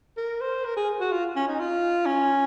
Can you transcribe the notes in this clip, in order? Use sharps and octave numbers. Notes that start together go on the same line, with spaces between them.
A#4
C5
A#4
G#4
F#4
F4
C#4
D#4
F4
C#4